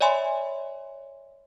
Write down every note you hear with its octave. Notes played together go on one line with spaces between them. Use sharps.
C#5 D5 E5 G#5 B5 C6